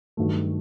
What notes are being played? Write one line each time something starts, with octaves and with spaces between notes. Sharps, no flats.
G2 D#3 F#3 A3